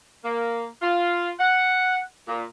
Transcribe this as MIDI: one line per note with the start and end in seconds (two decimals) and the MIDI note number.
0.24 0.65 58
0.82 1.30 65
1.39 2.00 78
2.26 2.42 46